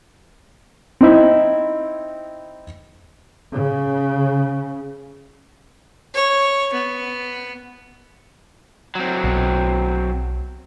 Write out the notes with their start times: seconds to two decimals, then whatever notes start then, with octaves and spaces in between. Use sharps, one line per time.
1.01 C4 D#4 E4
3.53 C#3
6.14 C#5
6.73 B3
8.95 F#3 C4
9.24 B1 B2